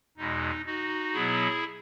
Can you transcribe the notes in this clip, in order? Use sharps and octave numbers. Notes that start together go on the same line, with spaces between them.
E2 B2 G#3 D#4
D#4 F#4
B2 F#3 B3 E4 G#4